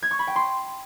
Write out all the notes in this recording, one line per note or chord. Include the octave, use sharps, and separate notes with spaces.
G#6
C#6
B5
G5
C6